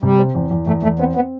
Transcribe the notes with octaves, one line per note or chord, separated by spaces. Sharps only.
C3 G3
C4
E2
E2
E2 A3
E2 A3
B3 C4
B3 C4